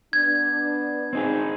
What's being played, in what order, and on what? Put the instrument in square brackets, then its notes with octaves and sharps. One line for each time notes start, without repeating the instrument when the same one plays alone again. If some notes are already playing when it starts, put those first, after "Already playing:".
[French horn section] B3 D4 [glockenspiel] G#6
[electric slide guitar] C4 D#4 G#4